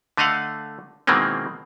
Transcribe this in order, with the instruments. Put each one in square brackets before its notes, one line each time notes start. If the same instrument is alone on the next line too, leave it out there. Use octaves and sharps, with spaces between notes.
[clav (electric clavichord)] D3 A3 D#5 F5 F#5
B2 D#3 E3 G#3 A#3 C4